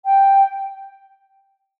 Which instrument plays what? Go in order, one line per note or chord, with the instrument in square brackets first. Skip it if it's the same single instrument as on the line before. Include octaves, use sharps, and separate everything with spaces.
[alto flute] G5